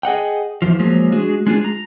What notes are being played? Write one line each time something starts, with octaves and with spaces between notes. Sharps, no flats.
G#4 D#5 F#5 G5
E2 F3
F3 F#3 G#3 A#3
G#3 D4 F#4 G#4
G#3 D4 F4 G#4
A#5